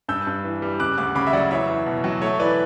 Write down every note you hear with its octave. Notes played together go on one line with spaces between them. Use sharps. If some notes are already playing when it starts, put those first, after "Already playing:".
G2 E6 G6
G2
E3
G3
C#3 D6 F#6
D2 D6 F#6
C#3 B5 D6
E5
F#3 D5 F#5
E2 C#5 E5
E2
B2
F#3
A3 C#5
E3 B4 D5